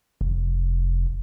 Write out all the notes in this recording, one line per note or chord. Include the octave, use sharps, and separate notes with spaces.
F1